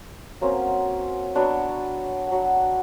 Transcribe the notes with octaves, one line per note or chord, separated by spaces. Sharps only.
F#3 A#3 C4 C#4
F#3 B3 D4 C#5
F#3 F#5